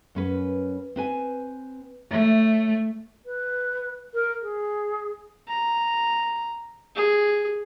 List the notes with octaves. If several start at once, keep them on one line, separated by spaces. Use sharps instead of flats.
F#2 C#4 B4
C4 B4 G#5
A3 C#5 E5
B4
A#4
G#4
A#5
G#4